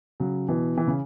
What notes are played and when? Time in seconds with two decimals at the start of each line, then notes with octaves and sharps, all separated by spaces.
0.20 C#3 F#3
0.48 B2 E3
0.77 E3
0.87 C#3